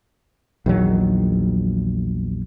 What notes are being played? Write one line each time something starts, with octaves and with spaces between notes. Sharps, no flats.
A#1 E2 D#3 F#3